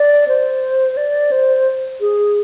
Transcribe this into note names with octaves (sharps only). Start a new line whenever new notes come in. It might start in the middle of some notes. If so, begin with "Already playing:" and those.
Already playing: D5
C5
D5
C5
G#4